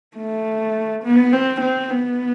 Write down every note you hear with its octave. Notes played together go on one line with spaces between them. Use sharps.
A3
B3
C4
C4
B3